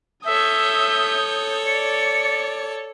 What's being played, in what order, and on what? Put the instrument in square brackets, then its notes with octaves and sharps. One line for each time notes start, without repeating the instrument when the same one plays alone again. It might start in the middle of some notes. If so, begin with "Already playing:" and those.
[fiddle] A4 C#5 [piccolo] E5 [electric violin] D#6 G6
[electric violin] D5 [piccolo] C#7